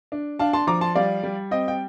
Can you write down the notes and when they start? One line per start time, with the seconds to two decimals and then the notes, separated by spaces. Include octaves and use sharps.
0.12 D4
0.39 D4 F5 A5
0.53 A5 C6
0.67 F3 A#5 D6
0.81 A5 C6
0.95 G3 D5 F5
1.23 G3
1.51 C4 D#5 G5
1.68 G5